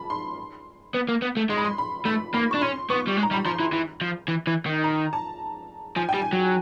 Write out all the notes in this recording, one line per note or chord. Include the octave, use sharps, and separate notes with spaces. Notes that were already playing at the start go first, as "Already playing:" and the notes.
Already playing: A5 B5
C6
B3
A#3
B3
A3
G#3 C6
B5
C6
B5
A3 B5
A#3 B5
D4 C#6
C#4 C6
B3 C#6
G3
G#3
A#5
G3 B5
F3 C6
E3
E3
F3
E3
E3
D#3
A#5
A5
F3 G#5
G5
G3
G#5
F#3